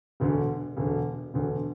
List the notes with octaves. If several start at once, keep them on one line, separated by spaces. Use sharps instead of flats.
E1 D2 D3
E1 D2 D3
E1 D2 D3